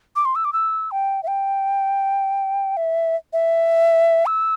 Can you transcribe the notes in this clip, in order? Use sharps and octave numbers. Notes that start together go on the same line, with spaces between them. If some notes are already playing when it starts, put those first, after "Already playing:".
D6
C6
E6
D6
E6
G5
E5
G5
E5
E5
E6